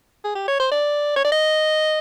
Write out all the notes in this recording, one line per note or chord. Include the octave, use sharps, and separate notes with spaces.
G#4
G4
C#5
C5
D5
C#5
D5
D#5